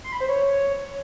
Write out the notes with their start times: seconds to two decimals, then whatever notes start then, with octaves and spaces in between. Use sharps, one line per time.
0.04 C6
0.12 B5
0.20 C5
0.29 C#5